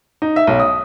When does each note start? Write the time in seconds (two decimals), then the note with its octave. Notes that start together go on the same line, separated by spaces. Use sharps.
0.22 D#4
0.36 E5
0.47 B1
0.60 D#6